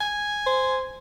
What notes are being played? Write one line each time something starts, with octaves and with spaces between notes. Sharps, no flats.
G#5
C5